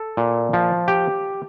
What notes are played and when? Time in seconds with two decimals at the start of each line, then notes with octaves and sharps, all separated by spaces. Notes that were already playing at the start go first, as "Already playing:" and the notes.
Already playing: A4
0.17 A#2
0.53 F3
0.88 G4